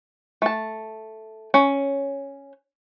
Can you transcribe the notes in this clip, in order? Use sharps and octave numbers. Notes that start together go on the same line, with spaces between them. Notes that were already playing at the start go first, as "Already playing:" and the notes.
A3 A5
C#4